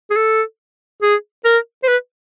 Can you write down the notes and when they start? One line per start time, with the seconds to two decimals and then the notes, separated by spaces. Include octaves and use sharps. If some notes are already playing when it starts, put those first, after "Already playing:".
0.10 G#4
0.16 A4
1.02 G#4
1.45 A#4
1.83 C5
1.88 B4